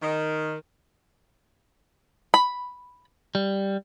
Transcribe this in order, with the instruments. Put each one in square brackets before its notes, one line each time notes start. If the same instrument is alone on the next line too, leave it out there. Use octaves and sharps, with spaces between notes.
[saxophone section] D#3
[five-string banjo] B5
[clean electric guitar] G3